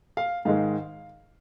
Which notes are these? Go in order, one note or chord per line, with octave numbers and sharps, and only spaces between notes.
F5
G#2 D#3 G#3 F5